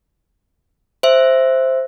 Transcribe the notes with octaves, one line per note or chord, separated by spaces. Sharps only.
C5 E5